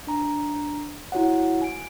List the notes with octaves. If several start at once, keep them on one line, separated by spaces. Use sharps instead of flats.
D4 A#5
E4 F#4 C#5 F#5
G#5 D7